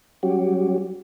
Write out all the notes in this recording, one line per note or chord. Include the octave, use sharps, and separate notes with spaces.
F#3 G3 C#4 F#4 G4